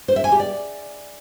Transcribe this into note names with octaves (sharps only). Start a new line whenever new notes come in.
C5
E5
G#5
G4
D5